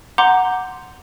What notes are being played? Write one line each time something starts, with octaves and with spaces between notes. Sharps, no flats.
F#5 A#5 C6 D6 G6